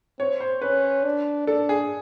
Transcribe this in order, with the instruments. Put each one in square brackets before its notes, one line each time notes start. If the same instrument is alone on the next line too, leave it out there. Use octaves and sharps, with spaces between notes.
[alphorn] C4 [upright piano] C#5
[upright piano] C5
[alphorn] C#4 [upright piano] B4
[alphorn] D4
[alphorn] D4 [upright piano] A4
[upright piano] G#4